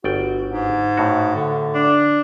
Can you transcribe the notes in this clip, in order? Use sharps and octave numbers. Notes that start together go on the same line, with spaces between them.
G1 F#4 D5 G5
G#2
A2 F#4
D3
D4